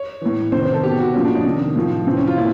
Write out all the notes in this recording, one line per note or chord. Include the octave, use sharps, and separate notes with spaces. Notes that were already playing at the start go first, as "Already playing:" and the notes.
Already playing: C#5
A2 E3
C3 D#3 C5
C5
A4
B2 G4
F#4
A#2 F3 C#4
D4
D#4
C3 D#3
A2 F3
C3 E3 C4
C#4
F4
A#2 E4